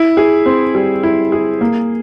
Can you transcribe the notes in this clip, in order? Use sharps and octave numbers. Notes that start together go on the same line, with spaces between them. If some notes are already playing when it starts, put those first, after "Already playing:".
Already playing: E4
G#4
C4
G3
E4
G#4
A#3